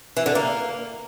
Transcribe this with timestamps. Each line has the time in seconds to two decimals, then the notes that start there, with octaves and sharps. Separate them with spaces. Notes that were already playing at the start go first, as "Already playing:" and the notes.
0.17 E3
0.26 D3
0.35 A#3